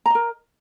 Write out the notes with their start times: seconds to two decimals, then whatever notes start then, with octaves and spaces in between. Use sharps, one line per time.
0.06 A#5
0.10 D#5
0.15 A#4